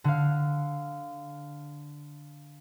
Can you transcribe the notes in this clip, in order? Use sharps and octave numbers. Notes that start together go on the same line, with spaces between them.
D3 F5